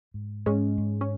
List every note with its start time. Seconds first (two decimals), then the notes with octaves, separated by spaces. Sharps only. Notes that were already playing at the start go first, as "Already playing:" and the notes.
0.14 G#2
0.46 G#2 G#3 C#4
0.77 G#2
1.01 C#4